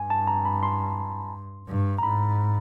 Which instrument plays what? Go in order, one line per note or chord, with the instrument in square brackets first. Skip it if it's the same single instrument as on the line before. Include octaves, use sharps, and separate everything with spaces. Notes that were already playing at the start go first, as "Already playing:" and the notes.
Already playing: [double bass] G2 [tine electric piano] G#5
[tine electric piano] A5
A#5
B5
C6
[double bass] G2
[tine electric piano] A#5
[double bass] G#2 [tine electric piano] B5